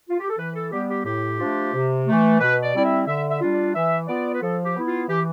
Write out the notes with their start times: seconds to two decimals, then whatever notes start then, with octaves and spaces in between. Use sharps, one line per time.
0.09 F4
0.19 G4
0.29 A4
0.38 E3 B4
0.55 A4
0.72 G3 B3 G4
0.89 G4
1.05 A2 G4
1.39 F3 A3 D4 F4
1.73 C3
2.06 E3 A3
2.40 B2 B4
2.63 D5
2.74 G3 C4 E4 D5
2.85 E5
3.07 D3 E5
3.30 E5
3.41 G3 D4 F4
3.51 D5
3.75 E3 E5
4.07 B3 F4 D5
4.34 B4
4.42 F3 A4
4.64 G4
4.76 B3 E4
4.87 F4
5.08 E3 G4